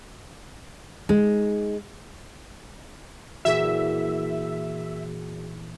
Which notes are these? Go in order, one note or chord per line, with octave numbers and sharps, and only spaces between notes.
G#3 D#4
A#2 E3 F#4 G#4 E5